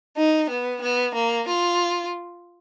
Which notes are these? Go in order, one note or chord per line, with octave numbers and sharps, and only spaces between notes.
D#4
B3
B3
A#3
F4